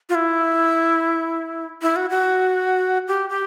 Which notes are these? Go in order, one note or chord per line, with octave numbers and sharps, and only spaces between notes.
F4
E4
E4
F#4
F#4
G4
G4